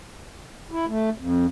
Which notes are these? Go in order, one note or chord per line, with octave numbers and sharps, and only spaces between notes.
E4
A3
F2